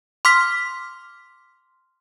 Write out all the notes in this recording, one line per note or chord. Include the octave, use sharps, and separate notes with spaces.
C6 D6 F6 B6